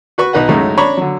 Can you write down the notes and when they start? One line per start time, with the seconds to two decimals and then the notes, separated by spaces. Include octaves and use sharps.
0.18 F#4 B4 C#6
0.33 B1 D#4 B4 D#5 F#5
0.49 F#2 A2 C#3 G#3 A3 D#4
0.78 D4 C#5 A#5 B5 C#6
0.97 D3 F#3